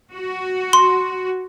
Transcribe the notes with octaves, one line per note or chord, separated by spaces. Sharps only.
F#4
C6